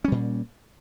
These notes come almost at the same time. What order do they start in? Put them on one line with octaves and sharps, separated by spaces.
C#4 G3 A#2